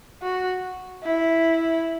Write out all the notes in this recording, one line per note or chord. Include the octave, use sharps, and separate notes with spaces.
F#4
E4